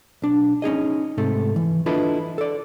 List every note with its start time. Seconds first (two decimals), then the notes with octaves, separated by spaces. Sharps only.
0.22 B1 D4
0.62 C#4 D#4 G#4 D#5
1.18 G#2 C3 A3 A4
1.56 E3
1.86 D4 E4 F4 A4 B4 D#5
2.38 A4 D5